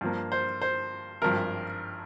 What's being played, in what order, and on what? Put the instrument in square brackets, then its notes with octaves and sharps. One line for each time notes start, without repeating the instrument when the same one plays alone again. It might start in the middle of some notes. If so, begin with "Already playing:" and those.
[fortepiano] G2 F3 A#3
C5
C5
G#1 G2 F3 A#4